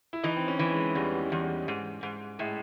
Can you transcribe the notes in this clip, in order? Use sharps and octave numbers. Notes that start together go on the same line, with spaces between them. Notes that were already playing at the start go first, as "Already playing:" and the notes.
E4
E3 D#4
C4
C#4
E3
G#3
E2 G3
E2
G#2
G#2
A2 G#3